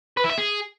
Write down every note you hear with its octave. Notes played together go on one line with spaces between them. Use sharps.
B4
E4
E5
G#4